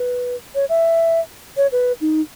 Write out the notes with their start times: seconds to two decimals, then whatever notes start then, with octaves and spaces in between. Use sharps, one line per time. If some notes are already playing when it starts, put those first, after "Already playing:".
Already playing: B4
0.55 C#5
0.69 E5
1.57 C#5
1.72 B4
2.01 D#4